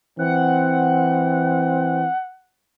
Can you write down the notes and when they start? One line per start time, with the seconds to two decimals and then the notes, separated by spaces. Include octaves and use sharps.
0.19 E3 C4 F#5